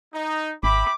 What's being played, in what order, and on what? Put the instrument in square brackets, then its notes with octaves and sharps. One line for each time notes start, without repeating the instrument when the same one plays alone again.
[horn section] D#4
[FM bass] G#1 [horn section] E5 G5 B5 [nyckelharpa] D6